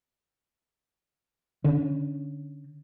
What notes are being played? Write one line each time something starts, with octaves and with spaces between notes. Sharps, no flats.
D3 C#4